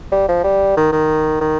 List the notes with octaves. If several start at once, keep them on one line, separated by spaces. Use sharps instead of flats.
G3
F3
G3
D#3
D#3
D#3